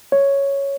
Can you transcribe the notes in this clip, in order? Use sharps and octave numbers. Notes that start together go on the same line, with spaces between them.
C#5